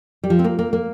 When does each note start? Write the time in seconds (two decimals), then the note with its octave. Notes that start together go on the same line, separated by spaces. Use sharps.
0.24 G3
0.30 F3
0.39 C4
0.44 A#3
0.59 A#3
0.73 A#3